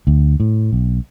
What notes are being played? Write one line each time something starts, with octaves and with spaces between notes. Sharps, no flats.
D2
A2
B1